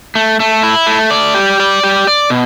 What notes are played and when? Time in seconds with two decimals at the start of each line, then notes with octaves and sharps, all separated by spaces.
0.15 A3
0.40 A3
0.63 E4
0.87 A3
1.11 D5
1.35 G4
1.60 D5
1.84 G4
2.07 D5
2.30 B2